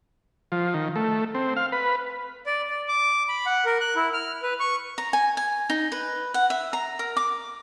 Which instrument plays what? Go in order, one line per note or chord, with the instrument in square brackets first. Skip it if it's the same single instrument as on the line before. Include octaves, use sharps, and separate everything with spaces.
[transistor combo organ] F3
D#3
A3
C4
F5
B4
[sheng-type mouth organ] D5
D5
D6
B5
F#5
A#4
F#6
E4
F6
B4
C#6
[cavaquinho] A#5
G#5
G#5
D#4
B4
F#5
E5
A#5
A#4
D6